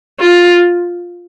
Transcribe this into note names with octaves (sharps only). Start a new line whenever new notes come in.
F4